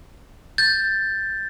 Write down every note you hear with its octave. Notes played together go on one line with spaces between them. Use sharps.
G6 A6